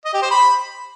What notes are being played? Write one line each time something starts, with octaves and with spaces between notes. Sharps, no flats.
D#5
G4
C5
B5